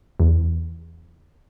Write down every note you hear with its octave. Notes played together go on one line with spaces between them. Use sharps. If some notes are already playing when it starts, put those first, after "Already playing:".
E2